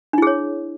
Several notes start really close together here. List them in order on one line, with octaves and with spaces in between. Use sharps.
D4 E4 G#4 C#5